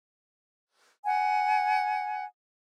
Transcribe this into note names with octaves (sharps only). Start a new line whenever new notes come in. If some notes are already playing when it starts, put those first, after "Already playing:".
F#5 G#5